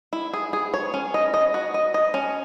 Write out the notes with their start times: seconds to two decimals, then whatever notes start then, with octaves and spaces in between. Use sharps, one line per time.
0.13 E4
0.34 G#4
0.53 G#4
0.74 C#5
0.94 C#4
1.14 D#5
1.34 D#5
1.54 F#4
1.74 D#5
1.94 D#5
2.14 C#4